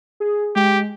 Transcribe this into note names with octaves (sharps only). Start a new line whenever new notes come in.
G#4
G#3 G4